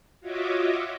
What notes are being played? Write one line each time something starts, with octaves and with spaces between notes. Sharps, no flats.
F4 F#4 C#5 D#5 E5 D6